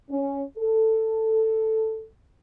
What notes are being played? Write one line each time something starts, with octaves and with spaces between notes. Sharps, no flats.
C#4
A4